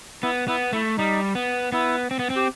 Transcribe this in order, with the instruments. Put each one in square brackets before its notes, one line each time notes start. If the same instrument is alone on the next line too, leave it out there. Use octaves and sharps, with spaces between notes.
[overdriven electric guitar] B3 [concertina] E4
[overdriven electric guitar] B3 [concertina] E4
[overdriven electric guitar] A3 [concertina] E4
[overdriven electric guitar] G3 [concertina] D#4
[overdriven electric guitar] B3
[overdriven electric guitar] B3 [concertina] E4
[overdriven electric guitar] C4
B3
C4
[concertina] G4